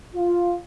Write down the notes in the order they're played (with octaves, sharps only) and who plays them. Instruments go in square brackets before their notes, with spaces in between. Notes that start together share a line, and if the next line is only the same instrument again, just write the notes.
[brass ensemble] F4